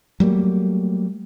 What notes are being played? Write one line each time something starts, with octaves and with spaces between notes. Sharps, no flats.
F#3 G3 A3 A#3